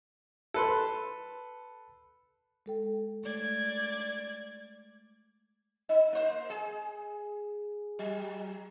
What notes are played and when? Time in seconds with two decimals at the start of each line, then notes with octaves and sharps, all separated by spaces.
0.54 A4 B4 C6
2.66 G#3 A4 G5
3.24 A3 D5 G#6
5.89 D#4
6.13 A#3 C5
6.50 G#4
7.99 F#3